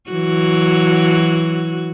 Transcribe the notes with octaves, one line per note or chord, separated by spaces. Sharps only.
E3 F#3 F#4